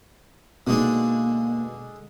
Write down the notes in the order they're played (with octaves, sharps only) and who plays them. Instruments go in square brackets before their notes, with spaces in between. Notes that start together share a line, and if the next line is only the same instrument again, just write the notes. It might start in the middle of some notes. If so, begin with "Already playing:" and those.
[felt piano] B2 D#4 [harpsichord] D3 G#3 D4 [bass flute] A#3